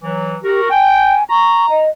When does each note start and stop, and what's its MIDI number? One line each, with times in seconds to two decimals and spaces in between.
0.03 0.36 52
0.03 0.36 54
0.44 0.67 66
0.44 0.61 67
0.44 0.67 70
0.70 1.14 79
0.70 1.24 80
1.30 1.81 82
1.30 1.66 85
1.70 1.89 75